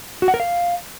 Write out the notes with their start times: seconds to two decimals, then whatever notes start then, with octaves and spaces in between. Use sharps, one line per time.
0.22 F#4
0.28 F#5
0.34 A#4
0.40 F5